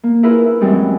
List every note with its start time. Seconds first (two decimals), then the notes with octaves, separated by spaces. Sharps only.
0.04 A#3
0.23 E4 F4 G#4 A#4 B4
0.46 E4
0.60 F#2 E3 G3 G#3 C4 C#4